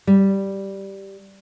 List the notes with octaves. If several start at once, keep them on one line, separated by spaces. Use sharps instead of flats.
G3